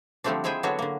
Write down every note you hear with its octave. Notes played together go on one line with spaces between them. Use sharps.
D3 F3 G3 A3 C4 D4
F3 G#3 E4 G#4 E5 G5
D3 F#3 B3 D4 F#4 C#5
D3 A#3